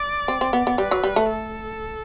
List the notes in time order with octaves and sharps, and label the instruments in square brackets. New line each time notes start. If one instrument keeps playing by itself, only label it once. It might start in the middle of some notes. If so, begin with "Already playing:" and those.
Already playing: [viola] D5
[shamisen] C4
C4
B3
B3
[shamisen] G3 [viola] B4
[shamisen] F#3
G3
A3
[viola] A4